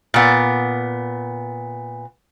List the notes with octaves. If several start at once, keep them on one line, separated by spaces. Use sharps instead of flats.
A#2 B3